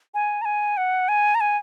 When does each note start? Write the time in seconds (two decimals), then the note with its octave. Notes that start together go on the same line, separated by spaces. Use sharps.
0.14 G#5
0.42 A#5
0.45 G#5
0.77 F#5
1.09 G#5
1.35 A#5
1.41 G#5